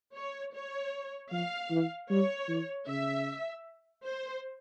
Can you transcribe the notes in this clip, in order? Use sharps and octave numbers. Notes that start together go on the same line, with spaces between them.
C#5
C#5
F3 F5
E3
G3 C#5
E3
C#3 E5
C5